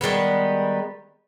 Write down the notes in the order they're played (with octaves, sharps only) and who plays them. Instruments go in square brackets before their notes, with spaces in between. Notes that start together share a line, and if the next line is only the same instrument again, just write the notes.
[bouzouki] D#3 G3 G#3 B3